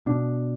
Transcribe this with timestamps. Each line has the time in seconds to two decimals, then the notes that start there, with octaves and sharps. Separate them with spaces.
0.06 B2 D4